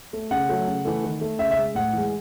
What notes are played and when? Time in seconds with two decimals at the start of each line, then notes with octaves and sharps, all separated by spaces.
0.13 A3
0.31 C#3 F#5
0.49 F#3 A3
0.67 C#3
0.85 E3 A3
1.04 D#3
1.21 A3
1.39 C#3 E5
1.51 E5
1.57 G#3
1.75 A2 F#5
1.93 E3 G#3